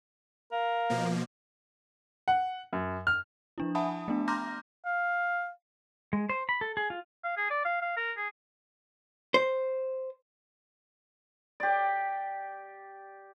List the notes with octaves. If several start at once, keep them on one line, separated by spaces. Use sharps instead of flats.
A#4 F5
B2 F3 A#3
F#5
F#2
F6
F3 D4 E4
E5 F#5 G#5 A5 B5 D#6
A3 B3 D4
A#5 C6 D6 F6 G6 A#6
F5
G#3
C5
B5
A4
G#4
F4
F5
G#4
D5
F5
F5
A#4
G#4
C5
G4 D5